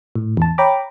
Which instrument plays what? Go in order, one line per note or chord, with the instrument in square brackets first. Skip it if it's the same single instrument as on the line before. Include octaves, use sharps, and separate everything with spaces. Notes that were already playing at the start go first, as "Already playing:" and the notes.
[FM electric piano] A2
E2 A5
C#5 G5 A#5 B5 D6